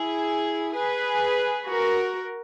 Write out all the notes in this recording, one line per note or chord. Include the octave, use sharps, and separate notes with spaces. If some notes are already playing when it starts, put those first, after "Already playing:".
Already playing: E4 G#4
G#4 B4
F#4 A#4